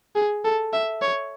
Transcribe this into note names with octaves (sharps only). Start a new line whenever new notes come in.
G#4
A4
E5
C#5